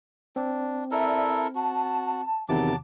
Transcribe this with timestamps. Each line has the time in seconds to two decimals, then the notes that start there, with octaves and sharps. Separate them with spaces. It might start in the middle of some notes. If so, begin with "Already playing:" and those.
0.36 C4 D4
0.91 E4 A4 A#4 D5 E5
1.55 F#4 A5
2.49 E2 C3 D#3 F#3 A5 D6